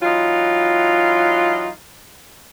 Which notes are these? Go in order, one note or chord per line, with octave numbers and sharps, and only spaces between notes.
E3 F#3 D#4 F4